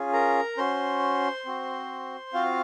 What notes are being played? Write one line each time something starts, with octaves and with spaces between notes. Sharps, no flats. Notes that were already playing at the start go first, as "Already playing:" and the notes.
Already playing: C#4 F4 G#4
A#4 A#5
C#4 F#4 C5 C6
C4 F#4
C4 F4 F#4 F5